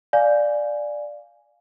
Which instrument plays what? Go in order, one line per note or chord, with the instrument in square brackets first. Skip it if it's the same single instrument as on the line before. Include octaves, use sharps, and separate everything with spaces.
[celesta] D5 F5 G#5